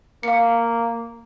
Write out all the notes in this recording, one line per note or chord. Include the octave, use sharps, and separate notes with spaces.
A#3 F5 C#7